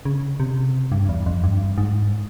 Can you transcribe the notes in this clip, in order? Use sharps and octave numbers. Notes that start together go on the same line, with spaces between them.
C#3
C3
G2
E2
F2
G2
G#2